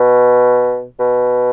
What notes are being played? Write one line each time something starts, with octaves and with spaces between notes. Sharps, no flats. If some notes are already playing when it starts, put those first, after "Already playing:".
Already playing: B2
B2